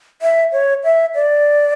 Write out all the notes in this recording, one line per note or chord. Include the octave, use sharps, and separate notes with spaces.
E5
C#5
E5
D5